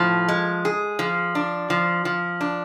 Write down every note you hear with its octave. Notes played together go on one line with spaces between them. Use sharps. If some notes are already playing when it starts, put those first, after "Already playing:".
Already playing: A2 F3
G#3
G#4
F3
D4
F3
F3
D4